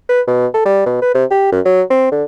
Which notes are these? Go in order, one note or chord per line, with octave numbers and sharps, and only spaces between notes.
B4
B2
A4
G3
B2
B4
C3
G4
F#2
F#3
C4
D3